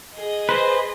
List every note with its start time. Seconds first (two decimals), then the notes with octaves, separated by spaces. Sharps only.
0.16 G#4 D#5
0.49 B4 C5